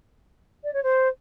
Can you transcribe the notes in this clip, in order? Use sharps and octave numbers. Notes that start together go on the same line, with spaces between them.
D5
C#5
C5